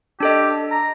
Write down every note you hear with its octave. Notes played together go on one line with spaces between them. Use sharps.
D4 G4 A4 D#5
A#5